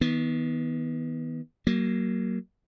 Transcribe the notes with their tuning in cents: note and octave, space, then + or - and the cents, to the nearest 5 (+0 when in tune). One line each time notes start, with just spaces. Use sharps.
D#3 +35 B3 -10
F#3 +30 A#3 +0